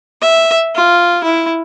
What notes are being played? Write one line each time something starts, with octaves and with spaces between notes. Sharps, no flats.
E5
F4
E4